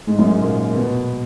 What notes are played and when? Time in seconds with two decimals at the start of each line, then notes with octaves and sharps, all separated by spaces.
0.07 G#2 G#3
0.18 F#2 F#3
0.30 G#2 G#3
0.41 A#2 A#3
0.75 B2 B3